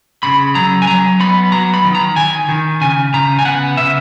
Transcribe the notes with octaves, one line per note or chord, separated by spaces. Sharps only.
C#3 B5
F#3 A#5
G#5
F#3 A#5
B3 B5
F#3 A#5
B5
D#3
A#5
D#3 G#5
D#3
C#3 G#5
C#3 A#5
G#5
B3 F#5
C#3 E5